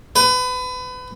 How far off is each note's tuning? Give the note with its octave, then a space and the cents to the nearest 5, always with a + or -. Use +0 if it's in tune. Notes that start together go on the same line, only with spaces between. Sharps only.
B4 +30